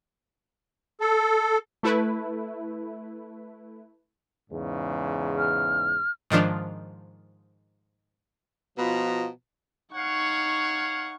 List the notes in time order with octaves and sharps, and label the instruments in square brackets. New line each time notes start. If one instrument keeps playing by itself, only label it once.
[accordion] A4
[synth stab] A3 E4 B4
[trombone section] E2 G#2 C#3
[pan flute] F6
[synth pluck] G#2 D#3 F3 D4
[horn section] B2 F3 F4 B4 D#5 A#5
[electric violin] D#4 C#6 [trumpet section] C#5 F5 F#5